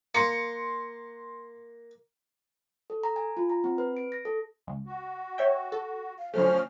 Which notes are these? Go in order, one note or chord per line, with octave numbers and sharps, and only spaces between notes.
A#3 C6 C#7
A4
A#5
G#5
F4
A#5
C4
B4
D7
A#6
A4
C#2
F#4
C#5 E5 G5
A4
F5
D3 F3 F#3 A3 C#4 C5 F6